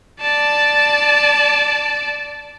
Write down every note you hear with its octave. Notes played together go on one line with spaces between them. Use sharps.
D5 A5